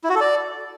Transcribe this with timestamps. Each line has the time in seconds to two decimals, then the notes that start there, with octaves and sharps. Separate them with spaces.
0.04 E4
0.09 F#4
0.15 A4
0.21 D5